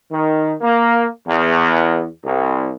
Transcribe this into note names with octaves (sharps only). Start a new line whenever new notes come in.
D#3
A#3
E2
C2